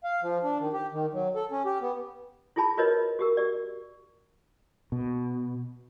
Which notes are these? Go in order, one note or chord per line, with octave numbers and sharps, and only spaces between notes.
F5
F3
D4
D#3
G4
D#3
F#3
A4
C#4
G4
B3
E4 F4 G#4 A5 B5
F4 F#4 A#4 B4 C#5 D#5
F#4 G4 A#4
F#4 G4 D5
B2